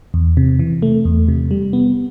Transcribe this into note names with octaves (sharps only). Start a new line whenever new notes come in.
E2
C3
E3
A3
E2
C3
G3
B3